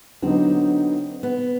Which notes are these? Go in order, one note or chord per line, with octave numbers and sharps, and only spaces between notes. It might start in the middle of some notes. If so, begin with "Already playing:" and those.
D3 F#3 B3 C4 D#4
B3